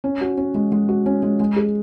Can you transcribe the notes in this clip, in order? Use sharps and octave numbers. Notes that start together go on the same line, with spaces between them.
C#4
F#4
C#4
G#3
G#3
F#4
C#4
G#3
G#3
G#4